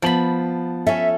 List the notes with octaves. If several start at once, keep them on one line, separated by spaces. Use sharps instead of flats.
F3 B3 A5 B5 F#7
C#4 A4 E5